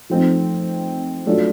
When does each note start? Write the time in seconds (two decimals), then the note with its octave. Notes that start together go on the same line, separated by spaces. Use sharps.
0.10 F3 A3 C4 D#4
1.27 F#3 A3 D4 F4 A4